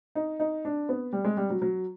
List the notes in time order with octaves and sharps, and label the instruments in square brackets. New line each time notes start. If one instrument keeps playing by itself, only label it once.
[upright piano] D#4
D#4
D4
B3
G3
G#3
G3
F#3
F#3